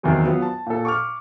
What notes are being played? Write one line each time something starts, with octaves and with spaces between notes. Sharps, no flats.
E2 C3 D#3 E3 F#3
F#3 B3 F4
A5
A#2 A4
C#6 D6 F6